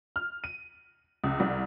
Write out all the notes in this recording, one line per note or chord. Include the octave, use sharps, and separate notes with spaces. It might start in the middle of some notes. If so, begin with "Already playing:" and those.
F6
D#7
C#2
C2